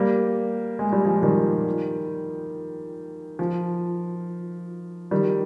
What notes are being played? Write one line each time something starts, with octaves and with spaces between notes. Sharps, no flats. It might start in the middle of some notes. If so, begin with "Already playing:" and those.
Already playing: G3 A#3
G#3
G3
F3 G#3
D#3 G3
F3
D#3 G3